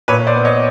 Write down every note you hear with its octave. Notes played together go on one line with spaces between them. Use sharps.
A#2 B4 C#5
C5 D5
B3
C#5 D#5